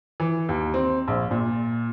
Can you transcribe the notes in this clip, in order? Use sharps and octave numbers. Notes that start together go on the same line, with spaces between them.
E3
D#2
C4
A#1
A#2